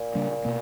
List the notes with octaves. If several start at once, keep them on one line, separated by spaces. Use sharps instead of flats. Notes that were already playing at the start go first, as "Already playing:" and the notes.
Already playing: A#2
C#3 G3 A#3 D4
B2 A#3